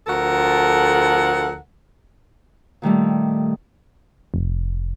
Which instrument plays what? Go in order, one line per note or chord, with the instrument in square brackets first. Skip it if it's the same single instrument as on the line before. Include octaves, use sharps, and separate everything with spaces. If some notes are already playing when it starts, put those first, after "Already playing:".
[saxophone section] D2 F3 A4 A#4 F#5
[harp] A#2 D#3 G3 A3
[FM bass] F1